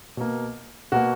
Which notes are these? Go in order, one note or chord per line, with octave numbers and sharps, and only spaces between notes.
B2 A#3
B2 A#3 F#4